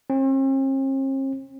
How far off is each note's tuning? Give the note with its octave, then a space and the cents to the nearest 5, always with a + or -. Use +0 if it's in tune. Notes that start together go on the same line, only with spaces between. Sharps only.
C4 +45